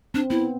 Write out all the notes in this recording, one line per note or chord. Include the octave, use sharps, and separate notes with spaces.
C4 D4
B3 E4